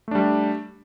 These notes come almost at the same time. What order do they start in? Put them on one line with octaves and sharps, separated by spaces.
A3 D4 G3